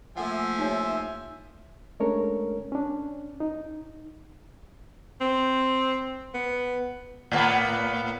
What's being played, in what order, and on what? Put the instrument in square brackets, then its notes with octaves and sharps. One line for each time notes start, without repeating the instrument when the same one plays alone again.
[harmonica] F3 G#5 [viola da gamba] A3 A#3 [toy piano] A4 F#5 [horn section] E5
[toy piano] D#4 G4 C#5
[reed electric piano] G#3 A3 C#4 D4 A#4 C#5
C#4 D4
D#4
[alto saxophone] C4
B3
[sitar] A2 A#3 B3